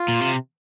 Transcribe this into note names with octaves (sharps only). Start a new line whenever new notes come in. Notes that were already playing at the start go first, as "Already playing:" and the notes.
Already playing: F4
A#2
C3